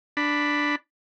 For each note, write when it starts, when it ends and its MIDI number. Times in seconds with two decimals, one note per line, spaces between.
0.17 0.76 62
0.17 0.76 83